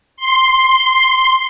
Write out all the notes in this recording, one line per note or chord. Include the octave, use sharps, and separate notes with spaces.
C6